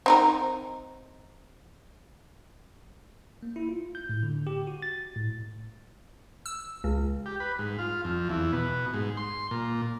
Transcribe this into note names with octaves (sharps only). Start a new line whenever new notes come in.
C4 D#4 A#4
A#3
E4
F4
G6
A2
D3
G4
F#4
A6
A2
E6
C#2
G4
B4
G#2
F4
F2
E2
B2
G#2
C6
A#2